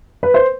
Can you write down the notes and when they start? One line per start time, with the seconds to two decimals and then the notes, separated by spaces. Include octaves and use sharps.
0.23 B4
0.34 C5